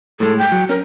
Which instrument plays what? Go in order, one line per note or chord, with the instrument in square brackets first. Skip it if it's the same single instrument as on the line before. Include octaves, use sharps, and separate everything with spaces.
[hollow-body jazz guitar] A2 G#3 [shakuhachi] A4
[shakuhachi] G5
[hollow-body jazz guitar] F#3
[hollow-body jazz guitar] C#4 [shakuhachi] A#4